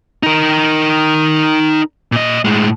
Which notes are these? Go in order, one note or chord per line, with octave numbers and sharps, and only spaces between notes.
D#4 A#4
A#2 D#5
A2 G#3